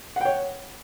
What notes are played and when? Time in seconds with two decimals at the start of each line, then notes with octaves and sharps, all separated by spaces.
0.16 F#5
0.21 G5
0.25 C#5